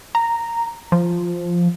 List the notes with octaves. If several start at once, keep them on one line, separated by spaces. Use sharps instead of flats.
A#5
F3